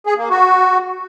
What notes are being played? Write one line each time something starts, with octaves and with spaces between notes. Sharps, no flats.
G#4
A#3
F#4